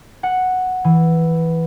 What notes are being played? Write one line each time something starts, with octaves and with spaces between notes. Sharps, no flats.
F#5
E3